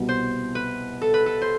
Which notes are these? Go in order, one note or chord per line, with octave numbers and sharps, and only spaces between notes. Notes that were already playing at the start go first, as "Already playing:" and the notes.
Already playing: C2 B2 B3
C5
B4
A4
B4
A4
C5